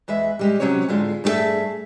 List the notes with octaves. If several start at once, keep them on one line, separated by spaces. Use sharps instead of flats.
E2 G#3 B4 E5
G3 G#3 G4
C3 F3 F#3 C#4 G4 C#5
A2 D3 G#3 F4
G2 A3 G4 G#4 E5